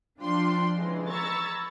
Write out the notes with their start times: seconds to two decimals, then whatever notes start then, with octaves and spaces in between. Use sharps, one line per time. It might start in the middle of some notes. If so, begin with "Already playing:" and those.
0.19 F3 D4 F4 G5 C6
0.77 C#3 E3 G#3
1.08 A#5 B5 C#6 E6 G#6 A6